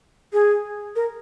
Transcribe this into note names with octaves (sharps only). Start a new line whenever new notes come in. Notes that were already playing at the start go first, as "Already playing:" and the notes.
G#4
A#4